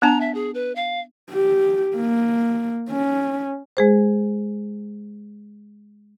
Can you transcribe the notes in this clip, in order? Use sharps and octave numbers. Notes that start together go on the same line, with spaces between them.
B3 D4 A5 A#5
E5
G#4
B4
F5
G4
A#3
C#4
G#3 G#4 C5